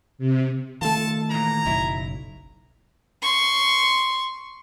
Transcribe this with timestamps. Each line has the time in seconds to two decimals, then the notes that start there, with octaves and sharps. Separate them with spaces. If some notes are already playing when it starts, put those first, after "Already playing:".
0.18 C3
0.81 D#3 A3 F4 A4 A5
1.30 A#2 E3 A#5
1.65 F#1 B1 F#3 E4
3.22 C6 C#6